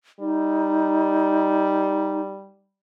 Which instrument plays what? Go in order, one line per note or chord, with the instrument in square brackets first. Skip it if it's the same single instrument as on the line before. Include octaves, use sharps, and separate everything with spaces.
[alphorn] G3 [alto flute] D#4